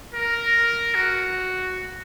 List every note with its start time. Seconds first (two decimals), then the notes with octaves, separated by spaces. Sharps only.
0.15 A#4
0.95 F#4